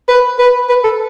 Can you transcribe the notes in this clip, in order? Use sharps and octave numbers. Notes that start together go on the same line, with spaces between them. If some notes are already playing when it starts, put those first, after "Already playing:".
B4
B4
B4
A4